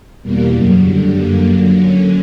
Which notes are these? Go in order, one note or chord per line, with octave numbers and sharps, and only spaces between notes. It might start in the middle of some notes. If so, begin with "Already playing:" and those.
E2 B2 G3 A#3
F#2 C#3 F#3
G2 D3 G3
F#2 D3 G3 A#3
D3 F#3 A#3
D3 F#3 C#4